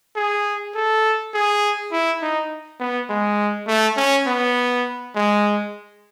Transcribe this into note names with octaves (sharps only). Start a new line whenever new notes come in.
G#4
A4
G#4
E4
D#4
B3
G#3
A3
C#4
B3
G#3